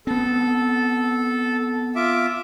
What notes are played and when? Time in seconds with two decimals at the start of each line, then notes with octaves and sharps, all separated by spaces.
0.07 B3 C4 A4
1.96 F4 E5 D6